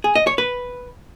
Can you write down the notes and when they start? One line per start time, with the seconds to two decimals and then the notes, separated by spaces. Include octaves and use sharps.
0.04 G#4
0.16 D#5
0.27 C#5
0.38 B4